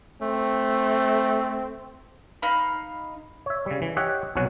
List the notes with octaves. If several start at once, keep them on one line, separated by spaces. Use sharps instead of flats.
A3 C4
D#4 F5 B5
C#5 E5
C#3 G3
E3
G4 C#5 D#5 E5 F#5 G5
C2 B2 F#3 C#5 F#5 G#5